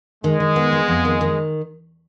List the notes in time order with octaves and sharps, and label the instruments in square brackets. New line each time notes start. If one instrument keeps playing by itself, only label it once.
[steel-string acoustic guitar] D#3 [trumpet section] G#3
[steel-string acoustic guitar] D#3
B3
B3
F2
D#3
D#3